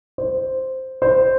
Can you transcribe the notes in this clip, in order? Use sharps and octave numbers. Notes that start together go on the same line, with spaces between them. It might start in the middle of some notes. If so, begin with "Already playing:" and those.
C5
C5